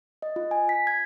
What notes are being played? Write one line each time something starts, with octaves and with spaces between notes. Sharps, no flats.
D#5
F4
G#5
B6
G#6